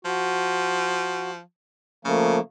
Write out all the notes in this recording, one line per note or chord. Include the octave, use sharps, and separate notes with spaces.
F3 F#4
C#3 F3 A3 A#3